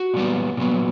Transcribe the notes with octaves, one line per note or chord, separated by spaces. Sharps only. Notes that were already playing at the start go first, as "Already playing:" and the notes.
Already playing: F#4
A#2 G3 B3
A#2 F#3 B3